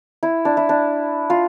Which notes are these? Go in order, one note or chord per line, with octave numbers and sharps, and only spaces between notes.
E4
D4
E4
D4
F4